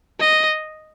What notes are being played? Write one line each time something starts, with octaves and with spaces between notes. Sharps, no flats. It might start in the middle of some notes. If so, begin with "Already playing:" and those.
D#5